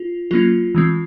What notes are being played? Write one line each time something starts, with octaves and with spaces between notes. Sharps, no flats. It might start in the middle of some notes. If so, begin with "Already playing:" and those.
Already playing: F4
F#3 A#3 C#4 F4
E3 G#3 C4